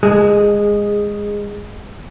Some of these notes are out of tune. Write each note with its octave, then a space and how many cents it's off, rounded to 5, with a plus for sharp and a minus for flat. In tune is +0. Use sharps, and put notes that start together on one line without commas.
G#3 -15 G#4 +0